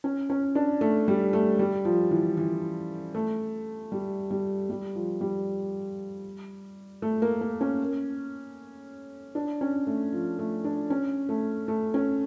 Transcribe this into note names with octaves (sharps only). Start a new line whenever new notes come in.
C#4
C#4
D4
A3
G3
A3
G3
F3
E3
E3
A3
G3
G3
G3
F3
G3
A3
A#3
A#3
C#4
D4
C#4
A3
F3
A3
D4
C#4
A3
A3
C#4